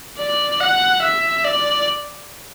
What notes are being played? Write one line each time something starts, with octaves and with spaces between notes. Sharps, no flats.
D5
F#5
E5
D5